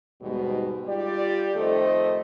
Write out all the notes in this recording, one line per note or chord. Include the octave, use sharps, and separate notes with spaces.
D#2 G#2 B2 G3 G#3 D#4
G3 F4 G4 D5
F2 D#3 A3 A4 C5 D#5